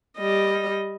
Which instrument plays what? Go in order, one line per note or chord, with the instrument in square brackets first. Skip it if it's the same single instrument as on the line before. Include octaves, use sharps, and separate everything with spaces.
[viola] G3 D#5